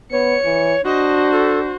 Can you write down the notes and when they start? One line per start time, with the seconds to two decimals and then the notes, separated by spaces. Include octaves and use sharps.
0.12 B3 C#5 C#7
0.45 E3
0.85 D4 F#4 C5 D#5
1.31 A4